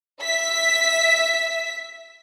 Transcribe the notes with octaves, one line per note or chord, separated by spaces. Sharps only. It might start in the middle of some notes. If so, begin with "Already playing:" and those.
E5 B6